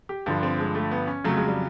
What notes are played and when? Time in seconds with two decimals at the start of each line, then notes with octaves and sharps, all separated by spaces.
0.09 G4
0.26 G2 D3 F3 D4
0.43 C4
0.59 G#3
0.75 A3
0.91 B3
1.08 C#4
1.24 F2 C#3 F#3 A3
1.37 G#3
1.48 G3